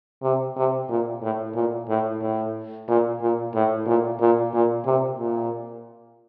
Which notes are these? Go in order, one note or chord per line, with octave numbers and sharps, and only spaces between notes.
C3
C3
A#2
A2
A#2
A2
A2
A#2
A#2
A2
A#2
A#2
A#2
C3
A#2